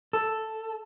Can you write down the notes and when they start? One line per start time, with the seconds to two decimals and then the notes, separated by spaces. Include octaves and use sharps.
0.13 A4